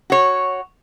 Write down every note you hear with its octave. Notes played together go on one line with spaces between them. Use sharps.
F#4 C#5